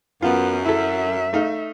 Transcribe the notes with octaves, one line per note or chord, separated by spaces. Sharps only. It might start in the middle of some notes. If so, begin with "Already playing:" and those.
F#2 B3 F4
E4 A4 E5
A3 D#4 F5